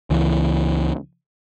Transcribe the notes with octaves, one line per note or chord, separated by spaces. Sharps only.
C#2 E3